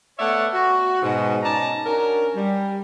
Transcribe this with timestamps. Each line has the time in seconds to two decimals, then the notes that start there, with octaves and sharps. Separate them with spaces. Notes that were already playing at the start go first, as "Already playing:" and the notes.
0.19 A3 B3 C#5 D5 E5 F#5
0.53 F#4
1.02 G#2 B2
1.43 C#4 D#4 D5 A5 A#5
1.85 C#4 D4 F#4 A#4
2.36 G3